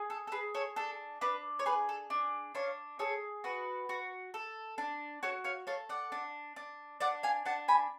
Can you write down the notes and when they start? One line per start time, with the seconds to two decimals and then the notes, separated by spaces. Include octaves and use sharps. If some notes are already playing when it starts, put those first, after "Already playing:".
Already playing: G#4
0.10 A4
0.27 A4
0.32 G#4 B4
0.55 A4 C#5
0.76 D4 A4
1.21 D4 B4
1.59 C#5
1.66 G#4 B4
1.89 A4
2.10 D4
2.55 D4 C#5 F5
2.99 G#4 A4 C#5
3.44 F#4 B4
3.89 F#4
4.34 A4
4.78 D4
5.23 F#4 A4 C#5
5.44 C#5 F5
5.67 A4 C#5 F5
5.89 D5 F#5
6.12 D4
6.56 D4
7.00 D4 D5 F#5
7.23 F5 G#5
7.45 D4 F#5 A5
7.68 G#5 B5